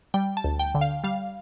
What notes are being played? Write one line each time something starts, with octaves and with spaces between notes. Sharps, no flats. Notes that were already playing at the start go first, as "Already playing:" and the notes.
G3 G5
A5
D2
G5
D3
F5
G3 F5